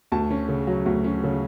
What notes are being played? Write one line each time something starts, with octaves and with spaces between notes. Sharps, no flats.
D2 A5
C#4
C#3
F#3
D2
C#4
C#3